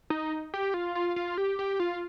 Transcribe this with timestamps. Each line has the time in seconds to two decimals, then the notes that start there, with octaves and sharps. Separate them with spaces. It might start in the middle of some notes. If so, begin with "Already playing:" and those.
0.10 D#4
0.54 G4
0.74 F4
0.95 F4
1.16 F4
1.38 G4
1.59 G4
1.80 F4